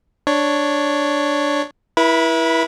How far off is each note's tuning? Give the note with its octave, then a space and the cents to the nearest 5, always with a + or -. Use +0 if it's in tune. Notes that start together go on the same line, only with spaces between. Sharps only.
D4 +0 C#5 +0
E4 +0 B4 -40 B5 +0